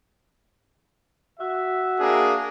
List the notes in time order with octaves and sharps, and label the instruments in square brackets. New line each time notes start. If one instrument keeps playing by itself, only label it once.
[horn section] F#4 E5
[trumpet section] A#3 D4 G#4